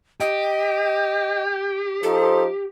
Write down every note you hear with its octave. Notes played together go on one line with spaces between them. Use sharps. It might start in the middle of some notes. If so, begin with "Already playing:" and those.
G4 D#5
F3 D#4 A4 C5